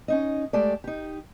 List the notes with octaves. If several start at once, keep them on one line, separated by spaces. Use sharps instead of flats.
C#4 D#4 D#5
G#3 A3 G4 A4 D5
D#4 G4